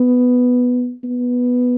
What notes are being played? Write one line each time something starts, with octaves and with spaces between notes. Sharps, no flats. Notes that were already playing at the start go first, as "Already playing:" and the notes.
Already playing: B3
B3